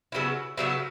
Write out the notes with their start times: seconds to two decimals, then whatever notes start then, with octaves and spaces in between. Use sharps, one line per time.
0.12 C#3 F#3 B3 E4
0.58 C#3 F#3 B3 E4